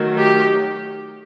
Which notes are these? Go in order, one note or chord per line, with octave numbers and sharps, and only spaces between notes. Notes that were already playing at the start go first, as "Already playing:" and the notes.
Already playing: D#3 F#3 A3
G4